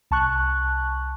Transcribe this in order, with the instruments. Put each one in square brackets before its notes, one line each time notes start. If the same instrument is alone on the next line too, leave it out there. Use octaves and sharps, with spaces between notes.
[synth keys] C2 A5 C#6 F#6